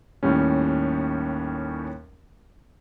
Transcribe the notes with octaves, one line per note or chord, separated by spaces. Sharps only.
D#2 A2 G3 C#4